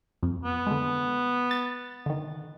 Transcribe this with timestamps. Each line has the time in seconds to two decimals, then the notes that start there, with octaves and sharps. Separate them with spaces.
0.23 F2
0.45 B3
0.67 D3 G#3
1.51 A6
2.06 D3 D#3